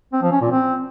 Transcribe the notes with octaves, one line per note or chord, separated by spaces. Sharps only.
C4
F3
C#4
A#2
C4